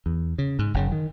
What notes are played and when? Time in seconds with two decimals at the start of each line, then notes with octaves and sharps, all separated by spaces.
0.06 E2
0.38 C#3
0.59 G#2
0.74 F#1 C#3
0.92 D#3